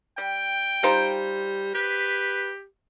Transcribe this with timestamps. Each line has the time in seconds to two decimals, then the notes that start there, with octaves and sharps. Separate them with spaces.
0.18 G3 G5
0.83 G3 D#4 F4 C5
1.75 G4 B4